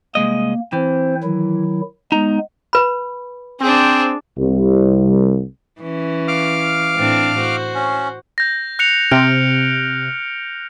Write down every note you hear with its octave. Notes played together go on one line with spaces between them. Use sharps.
C2 G#3 A#3 D#5
E3 C4 C5
D#3 F#3 E4
G#3 B3 D#4 A#5
B4 B5
C4 D4 G#4
C2
E3 C#4
F5 D6 F6
A2 C4 D4
F#4 C5
C#4
G6 A#6
F#6 C#7 F7
C3 F6 G6 D7